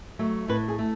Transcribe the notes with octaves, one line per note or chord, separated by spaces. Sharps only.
F#3 A3
A2 B4
G#4
A3